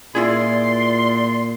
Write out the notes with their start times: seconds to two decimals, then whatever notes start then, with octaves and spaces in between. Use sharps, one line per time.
0.15 A#2 E4 F4 G#4 D5 C6